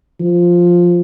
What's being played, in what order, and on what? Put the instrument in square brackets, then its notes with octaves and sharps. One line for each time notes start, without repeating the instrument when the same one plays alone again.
[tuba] F3